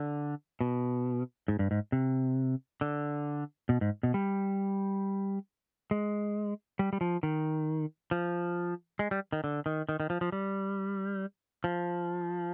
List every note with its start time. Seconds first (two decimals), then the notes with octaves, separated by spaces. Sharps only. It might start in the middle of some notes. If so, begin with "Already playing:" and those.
Already playing: D3
0.61 B2
1.48 G#2
1.59 G2
1.71 G#2
1.92 C3
2.81 D3
3.69 B2
3.81 G#2
4.03 B2
4.14 G3
5.91 G#3
6.79 G3
6.93 G3
7.01 F3
7.23 D#3
8.11 F3
8.99 G#3
9.11 G3
9.33 D#3
9.44 D3
9.66 D#3
9.89 D#3
10.00 D#3
10.10 F3
10.21 F3
10.32 G3
11.64 F3